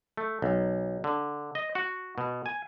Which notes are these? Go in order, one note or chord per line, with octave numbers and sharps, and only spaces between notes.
A3
B1
D3
D#5
F#4
B2
G#5